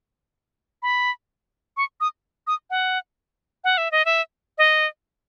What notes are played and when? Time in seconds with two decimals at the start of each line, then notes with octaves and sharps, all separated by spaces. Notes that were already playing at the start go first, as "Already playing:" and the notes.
0.83 B5
1.77 C#6
2.01 D#6
2.47 D#6
2.70 F#5
3.64 F#5
3.78 E5
3.91 D#5
4.05 E5
4.58 D#5